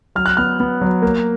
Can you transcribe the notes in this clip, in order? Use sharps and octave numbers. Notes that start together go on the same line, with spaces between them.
F#3 F6
F#6
B3 F6
B3
F#3
A#3